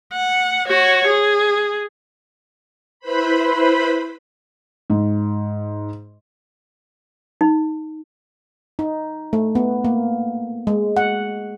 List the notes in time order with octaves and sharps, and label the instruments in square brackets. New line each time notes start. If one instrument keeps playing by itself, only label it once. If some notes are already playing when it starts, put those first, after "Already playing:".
[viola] F#5
F#4 C#5
G#4
[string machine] E4 B4 C5 B5
[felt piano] G#2
[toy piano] D#4
[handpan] D#4
A3
B3
A#3
G#3
F#5